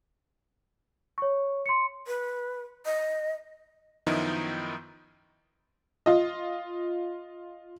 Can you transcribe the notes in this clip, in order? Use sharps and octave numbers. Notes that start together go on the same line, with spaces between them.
C#5 C#6
C6 C#7
B4
D#5
F#2 D#3 F3 B3 D#4 E4
F4 D#5